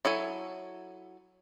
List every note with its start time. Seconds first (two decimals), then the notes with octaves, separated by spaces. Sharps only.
0.05 F#3 E4 A4 G#5